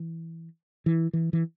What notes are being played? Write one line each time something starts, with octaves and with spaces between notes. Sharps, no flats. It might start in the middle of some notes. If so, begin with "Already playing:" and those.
Already playing: E3
E3
E3
E3